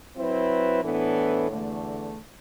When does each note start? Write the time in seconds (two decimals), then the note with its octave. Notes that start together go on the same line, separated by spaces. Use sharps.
0.16 F#3 C4 E4 B4
0.83 A2 E3 B3 D4 A4
1.50 E2 D3 A3